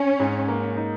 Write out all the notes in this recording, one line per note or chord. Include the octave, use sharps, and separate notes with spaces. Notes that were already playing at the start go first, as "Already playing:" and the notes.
Already playing: C#4
G#2
A#3
D#4